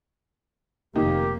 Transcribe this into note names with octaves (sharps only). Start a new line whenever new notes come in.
F1 A#2 D#3 A#3 D#4 G4